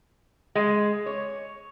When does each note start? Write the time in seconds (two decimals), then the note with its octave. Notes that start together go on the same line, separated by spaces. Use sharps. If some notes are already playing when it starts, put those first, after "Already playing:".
0.55 G#3
1.06 C#5